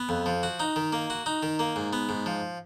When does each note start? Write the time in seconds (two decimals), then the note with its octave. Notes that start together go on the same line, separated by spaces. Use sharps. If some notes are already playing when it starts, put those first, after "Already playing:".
Already playing: B3
0.09 F2
0.26 F3
0.43 F#4
0.60 D#4
0.76 D#3
0.92 A#3
1.10 F#4
1.26 D#4
1.43 D#3
1.59 A#3
1.76 G#2
1.93 B3
2.09 G#2
2.26 F3